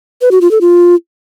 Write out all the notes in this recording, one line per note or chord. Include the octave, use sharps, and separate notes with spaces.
B4
F#4
F4
A4
F4